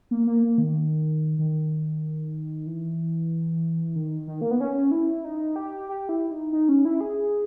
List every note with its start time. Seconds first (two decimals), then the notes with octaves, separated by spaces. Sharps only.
0.11 A#3
0.27 A#3
0.43 A#3
0.58 D#3
1.39 D#3
2.67 E3
3.96 D#3
4.27 D#3
4.41 A#3
4.51 B3
4.60 C#4
4.91 E4
5.25 D#4
5.56 G4
5.89 G4
6.09 E4
6.31 D#4
6.53 D#4
6.69 C#4
6.85 E4
7.01 G#4